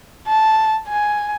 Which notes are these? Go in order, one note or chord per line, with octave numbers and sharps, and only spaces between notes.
A5
G#5